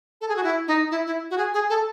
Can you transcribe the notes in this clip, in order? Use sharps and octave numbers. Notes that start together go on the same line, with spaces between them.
A4
G#4
F#4
E4
D#4
E4
E4
F#4
G#4
G#4
A4